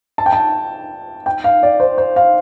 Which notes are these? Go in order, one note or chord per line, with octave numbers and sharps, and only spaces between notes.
A5
G5
A5
G5
F5
D5
C5
C5
F5